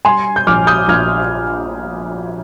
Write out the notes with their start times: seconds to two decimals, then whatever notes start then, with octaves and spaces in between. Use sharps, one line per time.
0.05 G3 G#5 C6
0.36 G6
0.47 A#1 D6 F6
0.67 D#6 G6
0.88 A#1 F6 G#6